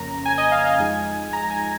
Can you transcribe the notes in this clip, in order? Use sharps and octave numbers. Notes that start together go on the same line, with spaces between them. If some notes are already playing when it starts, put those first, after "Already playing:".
Already playing: F2 C#3 A#3 C#4 A#5
G#5
D#5
F5
D#5
F5
F2 F3 G#3 D#4 G#5
A#5
G#5